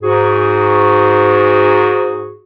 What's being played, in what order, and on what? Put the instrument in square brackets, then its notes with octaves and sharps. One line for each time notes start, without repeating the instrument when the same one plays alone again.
[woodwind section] G#2 F#4 G#4